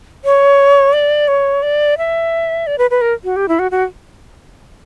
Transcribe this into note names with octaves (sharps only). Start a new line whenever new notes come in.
C#5
D5
C#5
D5
E5
D5
B4
B4
A#4
F#4
G4
E4
F#4
F#4